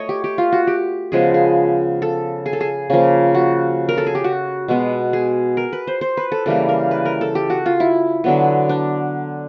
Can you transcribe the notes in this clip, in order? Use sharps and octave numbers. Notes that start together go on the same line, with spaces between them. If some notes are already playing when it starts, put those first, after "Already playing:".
Already playing: A3 C#5 D#5
G4
G4
F4
F#4
G4
C#3 F3 G#3 B3 G#4
G#4
A4
G#4
A4
G#4
C#3 F3 A#3
F#4
A#4
A4
G#4
G4
F#4
B2 G#3 B3
G#4
A#4
B4
C5
C5
B4
A4
C#3 E3 G3 A#3 A4
A#4
B4
A#4
A4
G4
F#4
F4
E4
D3 F#3 B3
D4